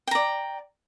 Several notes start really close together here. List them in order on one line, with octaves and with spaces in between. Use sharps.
G5 A#5 D5